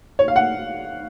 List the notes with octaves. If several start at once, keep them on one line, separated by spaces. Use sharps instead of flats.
C#5
F5
F#5